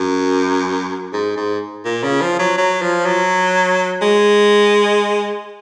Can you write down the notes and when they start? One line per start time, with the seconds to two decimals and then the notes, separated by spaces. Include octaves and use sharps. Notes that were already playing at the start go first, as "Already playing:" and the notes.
Already playing: F#2
1.13 G#2
1.37 G#2
1.85 A#2
2.03 C#3
2.21 F3
2.39 F#3
2.58 F#3
2.82 F3
3.06 F#3
4.02 G#3